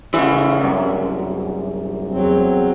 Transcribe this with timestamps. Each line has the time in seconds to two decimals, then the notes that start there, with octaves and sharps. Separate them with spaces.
0.14 C#3 E3
0.61 C2 F#2
2.09 E2 F#3 C4